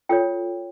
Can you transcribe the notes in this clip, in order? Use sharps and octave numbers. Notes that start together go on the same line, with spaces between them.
F4 A4 C#5 G5